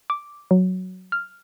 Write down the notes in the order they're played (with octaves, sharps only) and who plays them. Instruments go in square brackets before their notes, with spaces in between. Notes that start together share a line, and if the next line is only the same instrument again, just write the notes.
[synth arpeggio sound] D6
F#3
F6